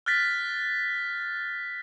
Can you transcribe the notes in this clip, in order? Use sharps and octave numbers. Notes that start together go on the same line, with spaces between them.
F6 F#6 A6 B6